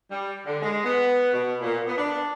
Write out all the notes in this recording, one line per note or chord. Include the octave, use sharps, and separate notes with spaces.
G3
D3
G#3
B3
B2
A#2
B3
D4